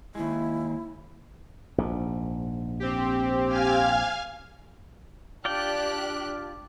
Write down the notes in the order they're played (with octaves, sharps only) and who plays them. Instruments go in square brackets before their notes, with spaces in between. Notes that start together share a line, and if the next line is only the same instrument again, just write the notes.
[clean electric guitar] D#2 G#3 [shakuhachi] E4
[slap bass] A#1 G#2
[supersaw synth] C4 G4
[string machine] F5 G#5 F6
[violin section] D4 G4 F#6 [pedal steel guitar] F4 D5 G5